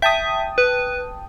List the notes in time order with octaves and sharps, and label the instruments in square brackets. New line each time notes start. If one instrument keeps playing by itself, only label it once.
[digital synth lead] E5 [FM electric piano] G5 A5 D#6
[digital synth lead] B4